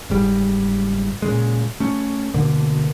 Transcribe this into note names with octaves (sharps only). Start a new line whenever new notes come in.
F#1 G#2 G3
A#2 C#3 G#3
A3 C#4
D2 B2 D3 A#3